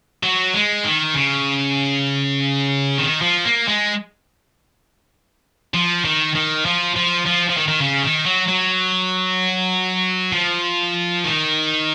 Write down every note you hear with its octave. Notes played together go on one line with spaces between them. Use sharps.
F#3
G#3
D#3
C#3
D#3
F3
A#3
G#3
F3
D#3
D#3
F3
F3
F3
F3
D#3
D#3
C#3
D#3
F#3
F#3
F3
D#3